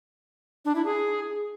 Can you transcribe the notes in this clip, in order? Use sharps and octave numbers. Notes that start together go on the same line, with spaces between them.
D4
E4
G#4